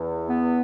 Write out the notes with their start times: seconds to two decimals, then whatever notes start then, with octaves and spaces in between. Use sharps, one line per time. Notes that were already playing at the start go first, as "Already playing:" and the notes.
Already playing: E2
0.29 B3